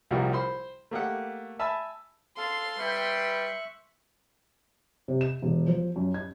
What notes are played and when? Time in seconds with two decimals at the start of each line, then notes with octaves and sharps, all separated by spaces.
0.11 C2 A#2 F3 G3 F#4 A#4
0.33 C5 B5 C6
0.91 A3 A#3 G4 F#5
1.59 E5 G#5 A5 B5 E6
2.38 A4 F5 C6
2.79 G3 B4 E5 G5 C#6 F#6
5.08 C3
5.21 E7
5.42 E1
5.67 F3
5.96 F#2
6.14 G#6